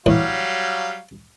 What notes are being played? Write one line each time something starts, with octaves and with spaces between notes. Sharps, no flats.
A2 E3 F#3 G3 F5